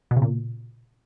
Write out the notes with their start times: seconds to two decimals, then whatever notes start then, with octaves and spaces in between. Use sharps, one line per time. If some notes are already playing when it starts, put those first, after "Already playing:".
0.11 B2
0.16 C#3
0.22 A#2